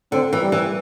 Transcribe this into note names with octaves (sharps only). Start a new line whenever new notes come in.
D3 C4
E3
G3
E3